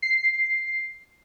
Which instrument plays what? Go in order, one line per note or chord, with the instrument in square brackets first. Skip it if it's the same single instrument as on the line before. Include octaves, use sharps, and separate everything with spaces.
[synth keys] C7